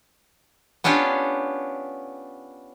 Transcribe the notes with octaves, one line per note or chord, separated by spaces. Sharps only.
B3 C#4 D4 F4 G4